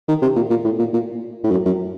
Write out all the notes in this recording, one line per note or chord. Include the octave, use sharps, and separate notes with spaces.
D#3
C3
A#2
A#2
A2
A#2
A#2
A2
F#2
F#2